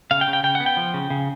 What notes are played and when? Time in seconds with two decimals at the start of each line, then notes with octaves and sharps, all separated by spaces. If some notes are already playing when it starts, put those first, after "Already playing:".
0.11 C#3 F5
0.21 G5
0.28 C#3
0.33 G5
0.43 C#3 G5
0.55 B3 F#5
0.66 G5
0.77 F3
0.94 C#3
1.10 C#3